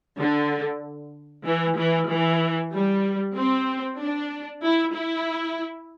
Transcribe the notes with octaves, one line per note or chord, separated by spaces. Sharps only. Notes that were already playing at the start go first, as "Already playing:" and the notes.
D3
E3
E3
E3
G3
C4
D4
E4
E4